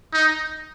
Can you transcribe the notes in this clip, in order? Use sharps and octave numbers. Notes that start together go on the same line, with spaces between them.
D#4